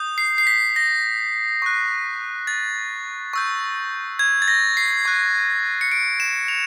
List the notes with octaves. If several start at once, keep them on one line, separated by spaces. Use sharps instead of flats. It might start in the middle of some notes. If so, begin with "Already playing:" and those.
Already playing: D#6 G6
C7
C7
B6
A#6
C#6 F#6
A6
C#6 E6 G6
G#6
A6
A#6
C7
C#6 F#6
C#7
D7
E7
F7